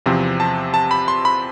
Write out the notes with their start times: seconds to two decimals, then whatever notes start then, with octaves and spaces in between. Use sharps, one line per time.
0.06 E2 C3 F3 C4
0.40 A5
0.74 A5
0.91 B5
1.08 C6
1.25 B5